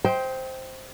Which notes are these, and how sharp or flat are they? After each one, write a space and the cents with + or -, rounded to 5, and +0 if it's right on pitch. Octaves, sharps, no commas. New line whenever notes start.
C5 +0 D#5 +45 G5 +0